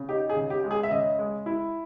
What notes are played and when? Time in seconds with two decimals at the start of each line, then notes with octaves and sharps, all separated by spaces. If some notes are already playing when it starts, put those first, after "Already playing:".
Already playing: C#3
0.09 D#4 G4
0.30 G#4
0.36 C#3
0.50 G4
0.64 G#3
0.71 G#4
0.83 E5
0.91 C#3 D#5
1.19 G#3
1.46 E4